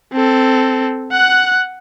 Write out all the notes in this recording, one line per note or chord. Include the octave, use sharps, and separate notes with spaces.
C4 A4
F#5 F#6